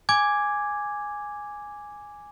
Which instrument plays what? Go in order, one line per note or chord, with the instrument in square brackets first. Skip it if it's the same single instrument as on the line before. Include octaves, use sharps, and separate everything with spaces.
[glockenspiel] G#5 D6 G#6